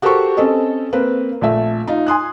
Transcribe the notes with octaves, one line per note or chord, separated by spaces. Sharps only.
F#4 G4 A4 A#4 C5 C#6
C4 C#4 A4 D#5
A#3 C4 B4
A#1 A3 E5
D#4 F4
G#5 C6 D#6 F#6